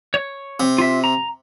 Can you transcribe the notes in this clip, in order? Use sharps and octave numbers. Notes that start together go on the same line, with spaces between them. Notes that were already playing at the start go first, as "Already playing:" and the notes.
C#5
C3
F4 E5
A#5